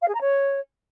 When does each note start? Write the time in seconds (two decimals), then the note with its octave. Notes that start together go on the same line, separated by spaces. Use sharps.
0.01 F5
0.08 G#4
0.14 A#5
0.20 C#5